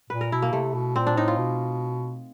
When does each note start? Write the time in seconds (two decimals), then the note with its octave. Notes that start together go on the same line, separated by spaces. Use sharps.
0.10 A#2 B4
0.21 A#4
0.32 B2 E4
0.42 A#3
0.53 C3 A3
0.75 B2
0.96 A#2 C4
1.07 D4
1.17 A2 D#4
1.28 F4
1.38 B2